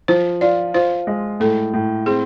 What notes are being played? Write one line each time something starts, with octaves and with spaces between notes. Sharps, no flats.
F3 C5
F4 D5
F4 C5
G#3
A2 A4
A2
C4 G#4